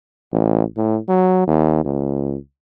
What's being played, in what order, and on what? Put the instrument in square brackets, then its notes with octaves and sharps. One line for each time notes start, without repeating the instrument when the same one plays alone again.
[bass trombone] A1
A2
F#3
D#2
C#2